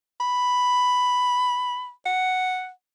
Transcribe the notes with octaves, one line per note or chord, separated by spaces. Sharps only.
B5
F#5